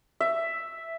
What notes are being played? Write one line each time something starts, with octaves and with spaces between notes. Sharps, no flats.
E5